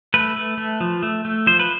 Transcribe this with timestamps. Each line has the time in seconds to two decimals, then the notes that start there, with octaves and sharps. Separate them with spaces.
0.14 A3 B4
0.36 A3
0.58 A3
0.80 F3
1.03 A3
1.25 A3
1.47 F3 C5
1.59 B4